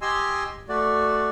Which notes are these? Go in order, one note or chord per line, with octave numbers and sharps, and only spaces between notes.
G4 D#5 G#5 C6 E6
A3 F#4 D5